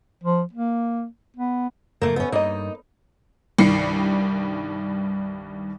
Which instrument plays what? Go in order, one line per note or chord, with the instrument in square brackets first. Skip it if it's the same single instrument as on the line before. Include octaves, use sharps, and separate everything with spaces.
[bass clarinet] F3
A#3
B3
[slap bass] F#1 F2 G#2 [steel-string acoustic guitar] A3 A#3
[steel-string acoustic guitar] B3 C#4
[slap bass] G2 [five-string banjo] A#3 D#5 [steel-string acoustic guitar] D#4
[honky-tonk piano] C2 G2 D#3 G3 C7 C#7